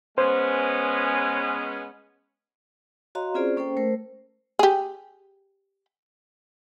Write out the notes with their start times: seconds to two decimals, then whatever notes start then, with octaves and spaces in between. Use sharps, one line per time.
0.18 G#3 B3 C#4 C5
3.15 F#4 C#5 D#5 F5 A#5 C6
3.34 C4 C#4 F4 G#4 C5 D5
3.57 A#3 C#4 A4 C5 G5
3.77 A3 A#4 C5
4.59 G4 G#4